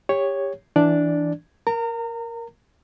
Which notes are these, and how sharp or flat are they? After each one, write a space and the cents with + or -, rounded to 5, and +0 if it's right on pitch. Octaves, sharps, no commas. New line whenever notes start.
G4 +25 C#5 +0
E3 +0 D4 +0 D5 +0
A#4 +0 A#5 -30